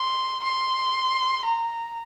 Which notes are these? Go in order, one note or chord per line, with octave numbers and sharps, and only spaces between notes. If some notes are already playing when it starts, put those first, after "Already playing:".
Already playing: C6
C6
A#5